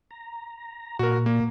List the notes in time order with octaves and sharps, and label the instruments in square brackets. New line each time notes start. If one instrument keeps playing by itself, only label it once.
[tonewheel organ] A#5
[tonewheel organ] A#2 [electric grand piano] F#4 A#4
[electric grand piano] A#3